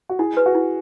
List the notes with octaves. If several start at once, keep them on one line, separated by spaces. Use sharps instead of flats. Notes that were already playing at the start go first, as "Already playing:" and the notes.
F#4
E4 G#4
B4
F#4
E4